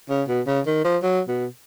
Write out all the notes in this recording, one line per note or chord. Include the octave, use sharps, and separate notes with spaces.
C#3
B2
C#3
D#3
F3
F#3
B2